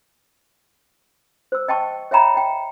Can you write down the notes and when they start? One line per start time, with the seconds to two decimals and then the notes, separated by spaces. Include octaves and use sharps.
1.52 C5 E6
1.68 D#5 G5 A5 C#6
2.11 C#5 E5 F5 G5 A#5 B5
2.34 D#5 G5